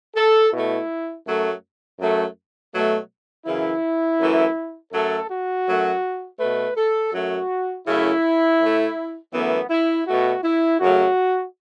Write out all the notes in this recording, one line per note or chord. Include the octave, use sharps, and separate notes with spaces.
A4
B2 A3 E4
F#2 F#3 A3
F#2 F#3 A3
B2 F#3 A3
F#2 C#3 E3 E4
F#2 E3 A3
F#2 F#3 A3 A4
F#4
F#2 F#3 A3
B2 A3 B4
A4
F#2 F#3 A3 F#4
F#2 C#3 A3 E4
A2 A3
F#2 E3 A3 B3
E4
B2 A3 F#4
E4
F#2 C#3 F#3 A3 F#4